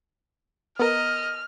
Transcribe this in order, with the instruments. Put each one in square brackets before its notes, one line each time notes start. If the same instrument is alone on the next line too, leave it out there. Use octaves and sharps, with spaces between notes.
[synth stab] B3 A#4 [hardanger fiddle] D#5 [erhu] F6